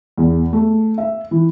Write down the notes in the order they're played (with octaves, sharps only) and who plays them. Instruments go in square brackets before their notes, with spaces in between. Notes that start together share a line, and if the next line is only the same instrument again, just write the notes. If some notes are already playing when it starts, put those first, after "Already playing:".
[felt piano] E2
A3
E5
E3